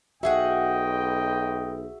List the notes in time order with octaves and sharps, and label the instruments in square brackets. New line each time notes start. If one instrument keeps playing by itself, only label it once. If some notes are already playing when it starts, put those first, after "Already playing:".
[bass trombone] B1 [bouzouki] F#4 G#4 F#5 [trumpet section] D#5 G5 [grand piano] E5